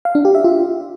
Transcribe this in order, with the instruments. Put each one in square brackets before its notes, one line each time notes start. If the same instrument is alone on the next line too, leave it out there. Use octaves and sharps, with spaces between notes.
[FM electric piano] F5
D4
G4
E5
F4